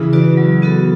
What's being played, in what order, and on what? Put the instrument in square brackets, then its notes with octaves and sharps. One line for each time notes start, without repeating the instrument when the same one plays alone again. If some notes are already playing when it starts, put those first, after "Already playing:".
Already playing: [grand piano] C#3 E3
[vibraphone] F#4 B4 D5
F#3
B3 F#4 A4